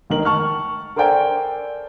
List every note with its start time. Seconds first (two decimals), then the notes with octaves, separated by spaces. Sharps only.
0.10 A1 D#3 A#4 F#7
0.25 A5 C#6 F6
0.96 A4 A#4 C5 D5 G5 G#5